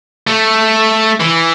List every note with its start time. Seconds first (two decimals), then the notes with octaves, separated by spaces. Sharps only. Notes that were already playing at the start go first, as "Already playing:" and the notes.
0.27 A3
1.20 E3